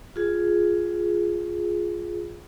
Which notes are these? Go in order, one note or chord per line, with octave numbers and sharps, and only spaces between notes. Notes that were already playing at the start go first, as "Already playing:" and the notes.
F4 G#4